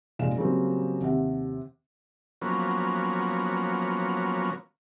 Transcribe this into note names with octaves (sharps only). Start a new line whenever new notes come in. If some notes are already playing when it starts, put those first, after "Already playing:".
F1 A#2 G#3 F5 E7
C#3 F#3 G3 A#3 C4
D#2 C3 F#5
F3 F#3 A#3 B3 C#4